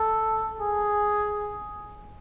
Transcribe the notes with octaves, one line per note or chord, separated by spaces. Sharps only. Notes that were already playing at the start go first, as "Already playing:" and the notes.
Already playing: A4
G#4